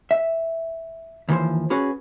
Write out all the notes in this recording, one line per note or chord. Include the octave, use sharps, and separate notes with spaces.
E5
D#2 E3 F3 C5
C#4 F#4 G#4 B4